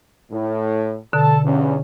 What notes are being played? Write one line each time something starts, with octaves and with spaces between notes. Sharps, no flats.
A2
B2 D3 A4 A5
E2 G2 C#4